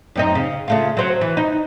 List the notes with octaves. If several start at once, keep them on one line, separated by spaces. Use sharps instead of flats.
F#2 C4 D#4
C#3
C#3 A3 F4
F#3 C5
E3
D#4